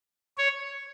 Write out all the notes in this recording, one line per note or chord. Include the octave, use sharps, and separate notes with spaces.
C#5